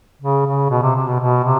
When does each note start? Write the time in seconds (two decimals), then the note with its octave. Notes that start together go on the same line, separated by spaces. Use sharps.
0.21 C#3
0.46 C#3
0.70 B2
0.82 C3
0.96 C3
1.07 B2
1.19 B2
1.44 C3